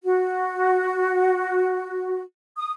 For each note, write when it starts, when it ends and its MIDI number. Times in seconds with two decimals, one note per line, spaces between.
0.04 2.21 66
2.57 2.71 87